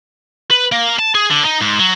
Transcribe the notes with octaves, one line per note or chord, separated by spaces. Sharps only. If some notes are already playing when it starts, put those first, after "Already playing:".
B4
A#3
A5
G#4
D3
D#4
G#2
F#3